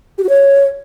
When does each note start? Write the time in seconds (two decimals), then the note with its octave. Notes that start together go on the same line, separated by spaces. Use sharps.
0.18 G4
0.24 F#4
0.29 C#5